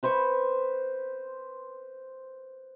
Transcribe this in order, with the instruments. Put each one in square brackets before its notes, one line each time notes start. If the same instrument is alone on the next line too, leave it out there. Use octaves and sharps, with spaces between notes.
[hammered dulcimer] B4 C5 B5 C#6